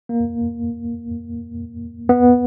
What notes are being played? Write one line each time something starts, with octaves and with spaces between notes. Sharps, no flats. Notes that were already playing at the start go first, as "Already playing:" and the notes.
A#3
B3